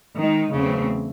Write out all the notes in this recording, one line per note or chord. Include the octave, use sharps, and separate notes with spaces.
D#3 G#3 D#4
E2 C#3 F#3 A3 C4